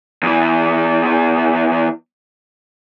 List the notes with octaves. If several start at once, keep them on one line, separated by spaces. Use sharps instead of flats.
E2 E3